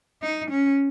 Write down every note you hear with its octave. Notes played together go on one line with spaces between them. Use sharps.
D#4
C#4